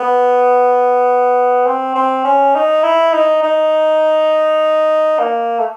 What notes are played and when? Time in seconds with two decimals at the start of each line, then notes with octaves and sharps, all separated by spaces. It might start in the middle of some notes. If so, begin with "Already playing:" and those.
Already playing: B3
1.66 C4
1.95 C4
2.25 C#4
2.55 D#4
2.83 E4
3.13 D#4
3.43 D#4
5.19 A#3
5.59 A3